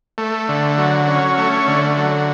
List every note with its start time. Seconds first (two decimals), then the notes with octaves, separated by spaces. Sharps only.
0.18 A3
0.49 D3
0.78 F#3
1.08 C#4
1.38 A3
1.67 D3
1.97 F#3